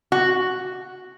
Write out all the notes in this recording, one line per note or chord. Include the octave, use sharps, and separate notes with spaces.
F#4